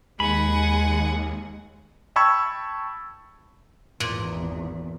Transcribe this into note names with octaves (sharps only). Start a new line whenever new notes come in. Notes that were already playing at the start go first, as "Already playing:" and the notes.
D#2 G#3 F#5 G#5 B5
G5 A5 B5 C#6 E6 G#6
G#1 E2 A#2